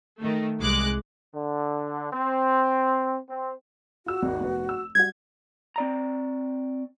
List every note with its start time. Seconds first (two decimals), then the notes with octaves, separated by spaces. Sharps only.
0.21 D#3 A3
0.59 C2 G#3 D6 F#6
1.34 D3
2.13 C4
3.30 C4
4.06 F4 F#4 E6
4.23 G#1 D#2
4.41 F1 B3
4.69 E6
4.95 G3 F#4 G#6
5.76 C4 D5 A#5